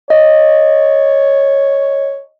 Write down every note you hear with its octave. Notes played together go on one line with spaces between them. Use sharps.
C#5 D#5